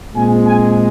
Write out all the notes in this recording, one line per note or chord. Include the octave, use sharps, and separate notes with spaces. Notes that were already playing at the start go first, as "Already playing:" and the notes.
A#2 G#3 C4 G#5
G#5